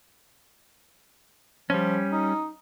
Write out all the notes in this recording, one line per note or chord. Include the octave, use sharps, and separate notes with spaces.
F3 G3 C#4
D#4